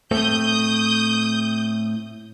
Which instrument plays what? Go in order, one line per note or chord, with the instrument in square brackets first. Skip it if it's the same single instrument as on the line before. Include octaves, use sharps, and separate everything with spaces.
[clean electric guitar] A2 A3 C4 [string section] D#6 G6